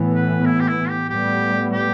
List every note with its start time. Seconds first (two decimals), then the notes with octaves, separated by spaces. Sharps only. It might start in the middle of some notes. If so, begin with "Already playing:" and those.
Already playing: A2 E3 B3
0.14 B4
0.46 E4
0.60 G4
0.68 E4
0.89 G4
1.09 A2 G3 B3 G4
1.72 G4